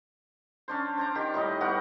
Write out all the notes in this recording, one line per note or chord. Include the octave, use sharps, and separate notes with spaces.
C#4 D4 C5
C5 D5 A#5
D#3 G4
A2 G3 D#4 D#5
B3 F#4 G4 A#4